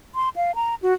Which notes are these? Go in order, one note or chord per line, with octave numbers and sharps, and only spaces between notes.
C6
F5
A#5
F#4